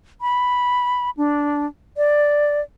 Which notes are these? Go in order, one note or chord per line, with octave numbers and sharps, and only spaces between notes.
B5
D4
D5